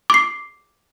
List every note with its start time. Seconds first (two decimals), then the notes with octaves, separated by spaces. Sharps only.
0.10 D6 C7